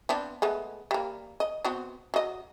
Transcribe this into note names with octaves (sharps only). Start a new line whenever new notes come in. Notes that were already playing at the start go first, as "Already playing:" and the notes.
B3 C4 D4
G#3 A3 B3
G3 A#3
D#5
B3 C4 F#4
F#3 D#5